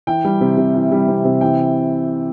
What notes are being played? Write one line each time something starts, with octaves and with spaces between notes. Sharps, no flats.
E3 G5
G3
C3
C3
E3
G3
C3
C3
E3 G5